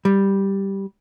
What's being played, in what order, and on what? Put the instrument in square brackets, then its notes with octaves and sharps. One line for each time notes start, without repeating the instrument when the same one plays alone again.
[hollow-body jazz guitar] G3